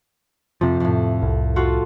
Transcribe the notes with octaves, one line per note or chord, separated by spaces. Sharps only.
F2 C3 F3
F2 A2
C2
F4 F#4 A4